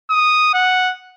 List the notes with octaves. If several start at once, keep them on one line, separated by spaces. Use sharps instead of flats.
D#6
F#5